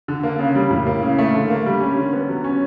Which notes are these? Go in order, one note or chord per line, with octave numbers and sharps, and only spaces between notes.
D3
A#3
C#3
G3
A2
A#3
C#3
A3
D3
A#3
G3
C#4
D3
B3
F#3
C#4